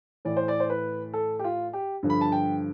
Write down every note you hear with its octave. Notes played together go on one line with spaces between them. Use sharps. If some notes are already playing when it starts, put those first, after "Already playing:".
A2 E3 D5
C5
D5
C5
B4
A4
G4
F4
G4
G2 D3 F3
B5
A5
G5